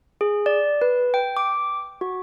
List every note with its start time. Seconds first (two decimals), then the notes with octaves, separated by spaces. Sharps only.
0.21 G#4
0.46 D5
0.82 B4
1.14 G5
1.37 D6
2.01 F#4